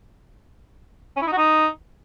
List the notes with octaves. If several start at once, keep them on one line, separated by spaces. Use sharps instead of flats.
C#4
E4
D#4
F#4
D#4